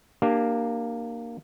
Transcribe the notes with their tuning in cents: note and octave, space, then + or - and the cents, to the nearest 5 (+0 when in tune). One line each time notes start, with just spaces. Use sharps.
A#3 +0 D4 +35 G4 +0